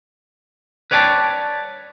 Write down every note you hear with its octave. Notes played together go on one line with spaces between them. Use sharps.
B4 C#5 D5 G5 A5